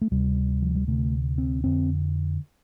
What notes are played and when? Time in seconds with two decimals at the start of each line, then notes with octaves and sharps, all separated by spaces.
0.02 A3
0.11 D2 C3 G3
0.62 F3
0.75 G3
0.87 D2 C3 A3
1.38 C4
1.64 F2 D3 C4